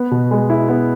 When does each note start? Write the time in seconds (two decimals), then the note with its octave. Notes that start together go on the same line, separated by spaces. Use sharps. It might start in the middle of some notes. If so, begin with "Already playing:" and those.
Already playing: B3
0.11 B2
0.31 G#3
0.50 E4
0.68 B3